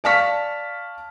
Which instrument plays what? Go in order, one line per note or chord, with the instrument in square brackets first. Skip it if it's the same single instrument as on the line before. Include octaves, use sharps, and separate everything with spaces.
[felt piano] D5 F5 A5 C#6 F6 B6